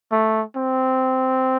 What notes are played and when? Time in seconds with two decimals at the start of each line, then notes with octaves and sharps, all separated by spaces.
0.12 A3
0.56 C4